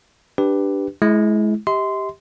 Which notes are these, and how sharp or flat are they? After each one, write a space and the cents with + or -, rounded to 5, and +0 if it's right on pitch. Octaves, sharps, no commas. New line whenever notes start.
D4 +0 G4 +0 B4 +0
G#3 +35 E4 +0
G4 +0 D#5 +45 C6 -15